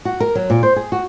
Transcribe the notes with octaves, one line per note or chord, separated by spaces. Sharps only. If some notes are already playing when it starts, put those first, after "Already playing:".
F#4
A#4
F#3
A#2
C5
G#4
F#4